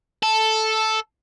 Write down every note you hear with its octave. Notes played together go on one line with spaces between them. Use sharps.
A4